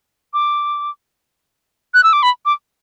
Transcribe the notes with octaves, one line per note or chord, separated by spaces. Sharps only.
D6
F#6
E6
D6
B5
D6